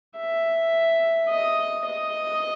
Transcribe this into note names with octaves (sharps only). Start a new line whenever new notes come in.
E5
D#5
D#5